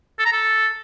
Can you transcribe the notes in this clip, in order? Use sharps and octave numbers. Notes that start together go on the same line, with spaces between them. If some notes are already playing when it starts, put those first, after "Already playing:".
A4
A#5
A4